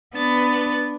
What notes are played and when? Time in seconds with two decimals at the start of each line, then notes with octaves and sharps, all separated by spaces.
0.15 B3 D4 A6